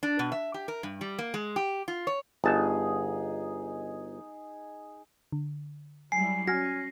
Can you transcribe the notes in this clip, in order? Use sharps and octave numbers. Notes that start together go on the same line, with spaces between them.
D4
B2
E5
G4
A#4
G2
G3
A#3
G#3
G4
F4
C#5
G1 D#4 G#4 A5
D3
F#3 G3 E4 G#5 C7
C#4 F#4 G#5 F6 G#6 A#6